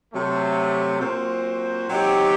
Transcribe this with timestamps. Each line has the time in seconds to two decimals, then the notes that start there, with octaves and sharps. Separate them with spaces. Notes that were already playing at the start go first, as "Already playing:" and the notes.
0.12 C3 F#3 A3
1.00 A#2 F#3 C4 F#4 C5
1.90 F#3 C4 D#4 G4